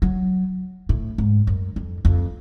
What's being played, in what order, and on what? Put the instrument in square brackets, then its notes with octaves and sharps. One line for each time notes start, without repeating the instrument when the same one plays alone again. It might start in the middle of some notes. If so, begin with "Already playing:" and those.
[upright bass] F#3
A2
G#2
F#2
F2
F2